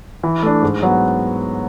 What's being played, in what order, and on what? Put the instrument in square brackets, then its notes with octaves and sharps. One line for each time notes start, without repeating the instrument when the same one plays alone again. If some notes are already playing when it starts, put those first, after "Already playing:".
[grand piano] E3
A3 D4
G#2
F#3 B3